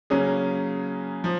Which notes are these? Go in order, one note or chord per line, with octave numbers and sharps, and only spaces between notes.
C#3 F#3 A#3 C#4 G#4
F3